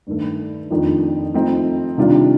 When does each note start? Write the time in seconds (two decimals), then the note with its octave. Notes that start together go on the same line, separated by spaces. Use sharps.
0.07 G2 D#3 A3
0.70 F2 D#3 A3 D4 F4
1.34 F3 A3 C4 D#4
1.98 C3 D#3 G3 D4 F4